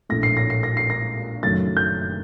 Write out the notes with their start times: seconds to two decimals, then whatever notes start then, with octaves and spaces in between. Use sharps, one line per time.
0.09 A#1 A2 A3 A#6
0.23 C7
0.37 A#6
0.50 C7
0.63 A#6
0.77 C7
0.90 A#6
1.43 F#1 F#2 D#3 F#3 A3 A6
1.77 G6